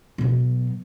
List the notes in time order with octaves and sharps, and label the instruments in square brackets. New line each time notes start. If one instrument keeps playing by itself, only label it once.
[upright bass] B2 F#3